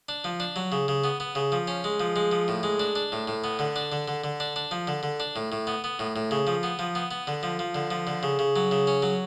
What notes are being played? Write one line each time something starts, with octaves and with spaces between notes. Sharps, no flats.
D4
F3
D4
F#3
C#3
C#3
B3
B3
C#3
F3
C#4
G#3
F3
G#3
F3
A2
G#3
D4
D4
A2
A2
B3
D3
D4
D3
D3
D3
D4
D4
F3
D3
D3
D4
A2
A2
B3
B3
A2
A2
C#3
F3
B3
F3
B3
B3
D3
F3
F3
D3
F3
D3
C#3
C#3
F#3
C#3
C#4
F#3